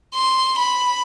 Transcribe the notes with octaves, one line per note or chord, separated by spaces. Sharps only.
C6
B5